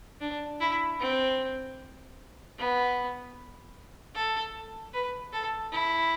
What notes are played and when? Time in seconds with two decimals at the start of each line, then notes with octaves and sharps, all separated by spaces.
0.21 D4
0.60 E4
1.00 C4
2.58 B3
4.15 A4
4.94 B4
5.33 A4
5.72 E4